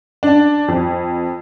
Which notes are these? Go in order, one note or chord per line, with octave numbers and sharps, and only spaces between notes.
D4
F2